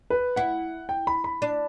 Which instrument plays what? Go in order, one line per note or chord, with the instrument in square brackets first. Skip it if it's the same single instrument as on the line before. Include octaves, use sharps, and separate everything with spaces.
[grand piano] B4
[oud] E4 [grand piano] F#5
[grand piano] G5
B5
B5
[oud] D4